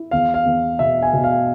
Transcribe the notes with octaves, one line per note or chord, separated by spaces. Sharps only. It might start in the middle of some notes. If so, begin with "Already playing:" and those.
Already playing: E4
E2 F5
F5
E2
B2 E5
G#5
B2
F5